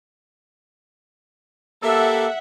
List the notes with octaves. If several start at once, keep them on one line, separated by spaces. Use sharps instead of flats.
A#3 G4 A4 E5 F#5